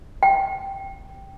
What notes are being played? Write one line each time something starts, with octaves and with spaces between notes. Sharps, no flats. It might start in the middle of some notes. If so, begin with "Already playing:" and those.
G5